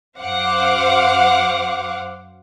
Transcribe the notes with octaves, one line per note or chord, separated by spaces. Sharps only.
F#2 C5 F5 F#5 D6